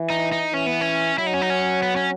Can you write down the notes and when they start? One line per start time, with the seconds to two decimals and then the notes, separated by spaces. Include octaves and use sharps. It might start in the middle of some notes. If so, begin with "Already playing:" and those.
Already playing: E3
0.10 D#4
0.32 D#4
0.53 E3 C#4
0.67 B3
0.81 C#4
1.18 F#3 E4
1.27 D#4
1.34 C#4
1.42 D#4
1.50 C#4
1.83 B3
1.96 C#4